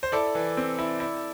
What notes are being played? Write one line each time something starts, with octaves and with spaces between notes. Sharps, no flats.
C5
E4 A4 D5
E3
C4
E4
E4